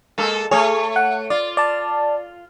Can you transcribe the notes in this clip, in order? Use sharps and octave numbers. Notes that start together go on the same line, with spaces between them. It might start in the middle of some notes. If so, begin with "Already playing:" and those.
G#3 A#3 A4
A3 G#4 C#5
F#5
F4 D5
D5 A5